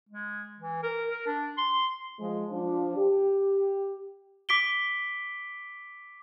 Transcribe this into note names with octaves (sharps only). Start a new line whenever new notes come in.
G#3
E3
A#4
A#4
D4
C6
F3 G#3
F3 D4
G4
D6 B6 D7 G7